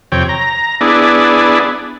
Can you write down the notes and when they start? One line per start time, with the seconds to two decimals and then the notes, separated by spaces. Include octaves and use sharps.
0.12 F2 C3 C#5 G5
0.29 A#5
0.81 B3 D4 E4 G#4 D5